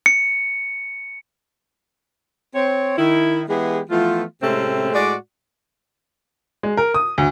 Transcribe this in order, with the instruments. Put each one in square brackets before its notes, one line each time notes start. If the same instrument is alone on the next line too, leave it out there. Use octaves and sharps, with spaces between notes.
[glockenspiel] C#7
[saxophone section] C4 C#5
D#3 E4
E3 G#3 B3 G4 G#4
E3 F3 A3 B3 F4
A2 C3 G#3 A3 C4 C#4
A2 G#3 F#4 D5
[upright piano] G#3
A#4
D#6
D2